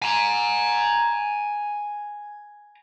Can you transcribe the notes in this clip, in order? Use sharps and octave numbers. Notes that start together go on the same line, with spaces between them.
G#5 A#5